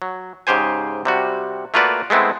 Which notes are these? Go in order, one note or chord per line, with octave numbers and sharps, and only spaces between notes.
F#3
G#2 C#3 G4 C5 G#5
C3 G3 F#4
A3 A#3 F4 F#4 B4 D5
G#3 A3 B3 C4 E4